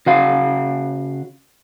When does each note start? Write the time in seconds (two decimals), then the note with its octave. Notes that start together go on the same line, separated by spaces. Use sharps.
0.06 C#3 F#4 F5